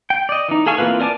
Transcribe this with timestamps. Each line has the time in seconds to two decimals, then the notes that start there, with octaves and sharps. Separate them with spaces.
0.10 G5
0.29 D5 D#5
0.48 E3 D#4
0.66 G#4 A4 F5 G#5 C#6
0.78 E3 A#3 C4 F4 B4
1.00 A#4 D5 G#5 A5 D6